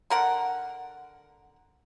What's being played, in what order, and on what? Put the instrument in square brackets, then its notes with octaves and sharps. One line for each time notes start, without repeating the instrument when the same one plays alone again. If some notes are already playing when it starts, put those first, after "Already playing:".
[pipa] D3 A#4 F#5